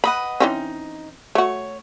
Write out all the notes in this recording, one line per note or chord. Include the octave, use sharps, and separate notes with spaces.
B4 D#5 F#5 B5
E3 C4 C#4 D#4
A3 F#4 C#5